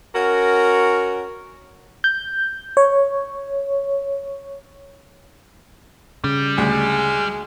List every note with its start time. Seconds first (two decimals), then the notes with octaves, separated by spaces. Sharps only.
0.15 C#4 F#4 A#4
2.04 G6
2.77 C#5
6.24 C#3 G3
6.58 D2 G#3